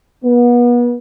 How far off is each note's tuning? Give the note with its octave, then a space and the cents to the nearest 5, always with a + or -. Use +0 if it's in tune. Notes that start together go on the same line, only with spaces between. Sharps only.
B3 -35